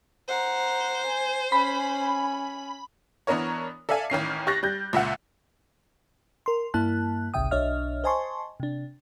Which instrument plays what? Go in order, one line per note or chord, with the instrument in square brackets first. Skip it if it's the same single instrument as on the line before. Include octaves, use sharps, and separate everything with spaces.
[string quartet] C5 [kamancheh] F#5 A#5
[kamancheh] G#5
[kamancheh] C#4 G#5 [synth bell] B5
[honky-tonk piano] E3 B3 D4 A#4 C#5
A4 D5 E5 F5 G#5
A1 D#3 C#4 C7
G4 C#6 F#6 A6 A#6
G3 G6
C#2 A#2 E5 F#5
[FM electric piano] A#4 C6
G2 A#3 E4 A5 F#6
G#1 C#2 C3 E5 G5 D#6
B1 D4 C#5 D#5 E5 F6
C5 D#5 G#5 A5 C6 C#6
C3 D4